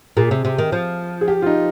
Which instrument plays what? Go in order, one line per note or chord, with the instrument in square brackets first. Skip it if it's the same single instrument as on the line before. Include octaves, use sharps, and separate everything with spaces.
[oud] A#2 [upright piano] G#4
[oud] C3
C3
D#3
F3
[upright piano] G#4
G4
F4
D#4